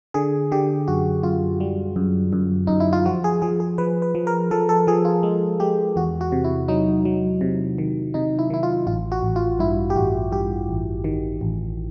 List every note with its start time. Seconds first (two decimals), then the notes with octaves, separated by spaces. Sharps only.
0.14 D3 G#4
0.52 D3 G4
0.88 F#2 F#4
1.23 F#2 F4
1.60 G3
1.96 F#2
2.33 F#2
2.67 F#2 D#4
2.80 E4
2.93 F4
3.05 F3 F#4
3.24 G#4
3.42 F3 G#4
3.60 G#4
3.78 F3 B4
4.02 B4
4.15 F3
4.27 A#4
4.51 F3 A4
4.69 A4
4.87 F3 G#4
5.05 F4
5.23 G#3
5.60 G#3 G4
5.96 E2 F#4
6.21 F#4
6.32 C3
6.44 E4
6.68 F#3 D#4
7.05 F#3
7.41 C3
7.78 D#3
8.14 C3 D#4
8.39 E4
8.50 D#3 E4
8.63 F4
8.87 A1 F4
9.12 F#4
9.23 A1
9.36 F4
9.59 G2 E4
9.90 G4
9.96 A1 F#4
10.32 G2 G4
10.69 A1
11.04 D#3
11.41 A1